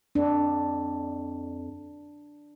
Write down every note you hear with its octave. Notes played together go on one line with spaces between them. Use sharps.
F2 D4